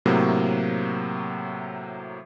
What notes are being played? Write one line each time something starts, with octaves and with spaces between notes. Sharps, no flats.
A2 C3 F#3 A#3